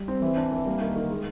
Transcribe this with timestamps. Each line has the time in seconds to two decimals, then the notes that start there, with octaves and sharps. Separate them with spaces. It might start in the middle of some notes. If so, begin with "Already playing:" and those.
Already playing: G3
0.08 C4
0.22 E3
0.37 D4
0.52 E3
0.66 G3 A#3
0.81 D#3
0.96 D#3
1.10 G#3